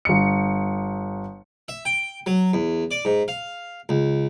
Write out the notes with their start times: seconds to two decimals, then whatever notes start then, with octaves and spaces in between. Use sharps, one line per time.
0.05 G1 C#7
1.68 E5
1.85 G5
2.26 F#3
2.53 E2
2.91 D5
3.05 G#2
3.28 F5
3.89 C#2